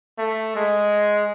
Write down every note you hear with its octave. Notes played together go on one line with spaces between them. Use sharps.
A3
G#3